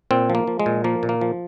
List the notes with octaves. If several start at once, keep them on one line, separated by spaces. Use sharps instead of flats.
A#2 C4
F3
A#3
F3
G#3
A#2
F3 A#3
A#2
A#3
F3